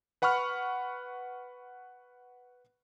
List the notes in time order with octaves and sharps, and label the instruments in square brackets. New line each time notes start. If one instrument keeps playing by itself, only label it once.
[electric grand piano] B4 F#5 B5 C#6 F6